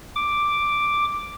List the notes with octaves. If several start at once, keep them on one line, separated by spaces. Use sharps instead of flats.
D6